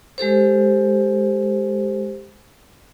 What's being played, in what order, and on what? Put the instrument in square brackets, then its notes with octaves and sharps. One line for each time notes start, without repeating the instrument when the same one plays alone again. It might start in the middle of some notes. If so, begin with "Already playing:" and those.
[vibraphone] G#3 G4 A4 C5